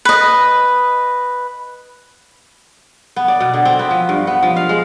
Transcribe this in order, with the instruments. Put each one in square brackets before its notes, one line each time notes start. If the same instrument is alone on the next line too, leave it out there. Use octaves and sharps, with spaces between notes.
[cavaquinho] B4 D#5
[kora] B3
D5
B2
D3
C4
B3
F3
G2
B3
F3
F5
G#3